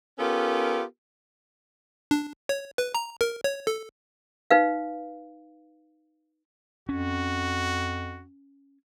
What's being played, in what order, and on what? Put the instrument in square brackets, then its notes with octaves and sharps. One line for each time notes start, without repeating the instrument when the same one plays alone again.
[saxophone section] B3 C#4 F4 G4 A4 A#4
[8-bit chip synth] D4
C#5
B4
A#5
A#4
C#5
A4
[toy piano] D#4 B4 F5
[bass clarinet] F2 [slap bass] C#4 [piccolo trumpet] F#4